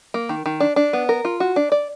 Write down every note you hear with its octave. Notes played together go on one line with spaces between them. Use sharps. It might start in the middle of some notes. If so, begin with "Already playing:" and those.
A#3
D#3
D#3
D4
D4
B3
A#4
F4
F#4
D4
D5